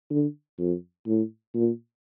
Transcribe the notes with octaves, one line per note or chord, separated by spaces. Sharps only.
D3
F2
A2
A#2